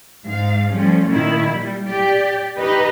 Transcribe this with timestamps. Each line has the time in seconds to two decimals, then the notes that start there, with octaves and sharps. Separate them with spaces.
0.24 G#2 F5
0.72 F3 G3 A3 C#4
1.11 A#2 D#3 E4
1.53 G3
1.89 G4 D5
2.58 D#4 G4 B4 D#5